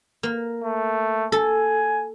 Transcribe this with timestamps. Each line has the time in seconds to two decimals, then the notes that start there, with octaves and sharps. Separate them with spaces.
0.23 A#3
0.64 A3
1.32 A4 G#5